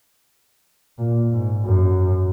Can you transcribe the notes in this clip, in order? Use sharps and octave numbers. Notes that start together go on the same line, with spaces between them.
A#2
G#2
F#2